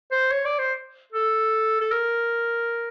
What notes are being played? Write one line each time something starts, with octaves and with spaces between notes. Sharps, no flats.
C5
C#5
D5
C5
A4
A4
A#4